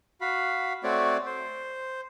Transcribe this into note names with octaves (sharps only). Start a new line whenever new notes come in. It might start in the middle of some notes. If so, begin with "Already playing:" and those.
F#4 F5 B5
A3 C4 F#4 C#5 D5
C5